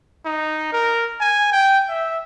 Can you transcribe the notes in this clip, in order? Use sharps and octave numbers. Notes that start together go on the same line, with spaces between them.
D#4
A#4
G#5
G5
E5